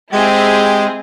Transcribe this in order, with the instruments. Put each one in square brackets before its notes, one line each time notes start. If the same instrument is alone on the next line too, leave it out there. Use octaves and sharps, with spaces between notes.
[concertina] G#3 [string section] C4 E4 G#4 [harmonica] G4